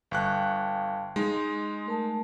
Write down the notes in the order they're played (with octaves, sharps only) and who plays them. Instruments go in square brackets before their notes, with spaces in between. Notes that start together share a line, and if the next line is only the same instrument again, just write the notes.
[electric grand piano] G1 C#6 F#6 [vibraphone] F5 G5 A5
[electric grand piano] G#3 D#4 [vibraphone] C6
[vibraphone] A3 A#4 A5